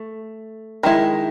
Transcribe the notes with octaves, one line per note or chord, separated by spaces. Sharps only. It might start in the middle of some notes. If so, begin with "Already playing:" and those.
Already playing: A3
D#3 G#3 E4